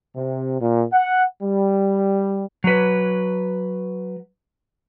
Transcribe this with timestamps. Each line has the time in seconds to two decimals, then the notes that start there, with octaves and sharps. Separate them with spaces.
0.16 C3
0.60 A#2
0.93 F#5
1.42 G3
2.64 F#3 B4